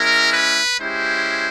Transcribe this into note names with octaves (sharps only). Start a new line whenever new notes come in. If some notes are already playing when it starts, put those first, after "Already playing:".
Already playing: G#3 C#4 E4 A#4
B4
G#3 C#4 E4 G4 C5